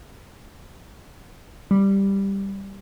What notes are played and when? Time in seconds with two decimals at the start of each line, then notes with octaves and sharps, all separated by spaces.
1.71 G3